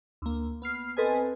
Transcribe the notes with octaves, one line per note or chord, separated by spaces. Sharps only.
D2 A#3
B3 F6 C7
C4 A4 B4 D#5 G#5